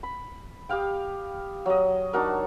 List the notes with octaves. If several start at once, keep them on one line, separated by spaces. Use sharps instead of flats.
B5
G4 D#5 F5 G5
F#3 D#5
D4 D#4 F#4 A#4